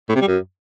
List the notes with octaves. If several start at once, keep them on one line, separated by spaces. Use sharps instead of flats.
A2
C3
G3
F#2